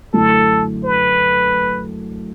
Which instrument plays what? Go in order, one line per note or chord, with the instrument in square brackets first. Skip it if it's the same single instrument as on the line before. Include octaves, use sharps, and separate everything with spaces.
[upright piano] F#2 D3 A3 E4 [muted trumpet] A4
[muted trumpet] B4